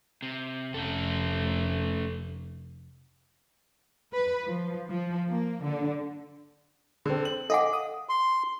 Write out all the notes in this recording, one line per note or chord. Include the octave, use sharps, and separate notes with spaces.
C3
F1 A3 C#4 A4
B4
F3
F3
A#3
D3
D3 C4
F#7
A4 D#5 F5 F#5 D6
D#6
C6